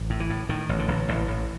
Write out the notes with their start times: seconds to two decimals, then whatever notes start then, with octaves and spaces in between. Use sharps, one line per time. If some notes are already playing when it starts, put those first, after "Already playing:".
Already playing: A1
0.10 A2
0.20 E3
0.30 A2
0.49 A2 D#3
0.69 A1
0.79 D3
0.88 A1
1.08 A1 E3
1.28 A1